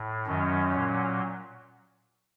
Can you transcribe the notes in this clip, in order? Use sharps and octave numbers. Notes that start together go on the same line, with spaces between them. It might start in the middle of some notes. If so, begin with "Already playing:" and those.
Already playing: A2
F#2 D#3 F#3 C#4
A#2 F#3